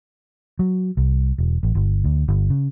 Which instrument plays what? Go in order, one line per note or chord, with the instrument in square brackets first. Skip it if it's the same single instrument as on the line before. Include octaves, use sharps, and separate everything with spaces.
[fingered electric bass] F#3
C2
E1
A1
G1
D2
G1
C#3